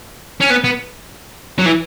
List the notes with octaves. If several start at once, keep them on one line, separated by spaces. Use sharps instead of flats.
C#4
B3
B3
F#3
E3